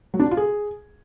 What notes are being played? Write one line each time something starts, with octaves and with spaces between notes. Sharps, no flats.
F#3
D4
F#4
F4
G#4